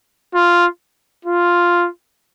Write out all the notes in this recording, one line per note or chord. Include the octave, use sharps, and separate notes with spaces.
F4
F4